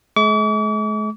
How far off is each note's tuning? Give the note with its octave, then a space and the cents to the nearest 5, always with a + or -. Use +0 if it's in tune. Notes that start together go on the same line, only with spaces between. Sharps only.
G#3 +45 D6 -45